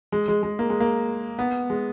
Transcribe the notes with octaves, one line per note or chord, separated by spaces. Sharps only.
G#3
G#3
G#3
A#3
G#3
A#3
B3
G#3